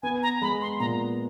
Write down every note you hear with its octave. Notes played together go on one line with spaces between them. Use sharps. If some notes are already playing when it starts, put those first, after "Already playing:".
B3 G#5
A#5
G#3 B5
C6
A#2 A#5